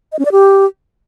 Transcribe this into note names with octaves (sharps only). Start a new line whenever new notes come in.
D#5
C#4
D5
G4